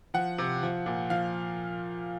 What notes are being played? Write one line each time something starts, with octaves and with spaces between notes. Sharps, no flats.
F3 F#5
C3
F3
A#2
F3 F5